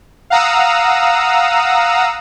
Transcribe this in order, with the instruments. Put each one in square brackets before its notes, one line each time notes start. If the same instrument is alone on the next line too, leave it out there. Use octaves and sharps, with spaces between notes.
[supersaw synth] F5 F#5 A#5 D#6 E6